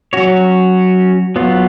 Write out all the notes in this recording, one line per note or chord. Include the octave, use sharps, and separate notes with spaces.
F#3 C#4 F#4 C#5
F#3 B3 F4